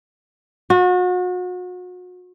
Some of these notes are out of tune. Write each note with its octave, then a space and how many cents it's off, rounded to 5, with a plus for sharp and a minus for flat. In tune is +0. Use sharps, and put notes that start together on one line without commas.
F#4 -35